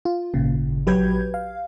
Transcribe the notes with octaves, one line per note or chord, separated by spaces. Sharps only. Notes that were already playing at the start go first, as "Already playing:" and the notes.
F4
G#1 A#2 C#3
A#1 F#3 G4 B4 G6 G#6
F5